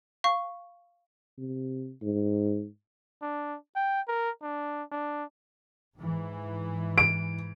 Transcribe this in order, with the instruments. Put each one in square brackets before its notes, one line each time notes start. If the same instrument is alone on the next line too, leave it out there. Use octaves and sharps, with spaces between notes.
[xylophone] F5 C#6
[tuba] C3
G#2
[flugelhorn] D4
G5
A#4
D4
D4
[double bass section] G#2 E3
[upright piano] D7